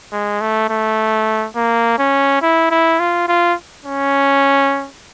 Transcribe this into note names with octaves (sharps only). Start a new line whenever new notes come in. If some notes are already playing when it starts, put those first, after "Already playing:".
G#3
A3
A3
A#3
C#4
E4
E4
F4
F4
C#4